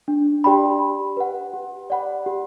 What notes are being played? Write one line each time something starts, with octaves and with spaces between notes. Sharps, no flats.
D4
G4 D5 G5 B5
G4
B4 F#5
G4
D5 F#5 B5
G4